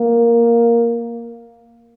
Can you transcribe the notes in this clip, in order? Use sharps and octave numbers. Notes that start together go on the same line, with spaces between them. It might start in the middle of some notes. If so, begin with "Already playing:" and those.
Already playing: A#3